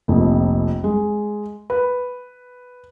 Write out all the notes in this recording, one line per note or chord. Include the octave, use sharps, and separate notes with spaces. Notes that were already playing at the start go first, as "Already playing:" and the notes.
F1 A#1 F2
G#3
B4